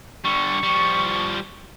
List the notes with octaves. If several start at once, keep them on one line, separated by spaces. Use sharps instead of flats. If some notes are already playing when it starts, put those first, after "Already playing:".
D3 G3 C#6
F3 G3